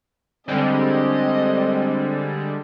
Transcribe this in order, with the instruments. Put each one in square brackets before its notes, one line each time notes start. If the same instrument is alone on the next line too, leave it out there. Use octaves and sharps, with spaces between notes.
[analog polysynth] D3 G3 G#3 [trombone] C4 [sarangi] D#5